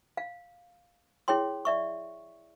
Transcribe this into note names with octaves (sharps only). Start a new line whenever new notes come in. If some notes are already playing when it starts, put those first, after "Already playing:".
F5
E4 G#4 C#5 G5 C6
D5 E5 C#6